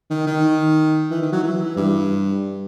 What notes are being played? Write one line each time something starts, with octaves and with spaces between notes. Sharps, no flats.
D#3
D#3
E3
D#3
F#3
E3
G2